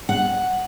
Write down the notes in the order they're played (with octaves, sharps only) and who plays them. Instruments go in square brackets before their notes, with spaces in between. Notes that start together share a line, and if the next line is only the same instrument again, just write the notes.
[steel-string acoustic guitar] F#5